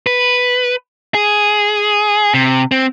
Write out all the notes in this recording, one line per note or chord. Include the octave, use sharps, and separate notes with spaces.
B4
G#4
C3
C4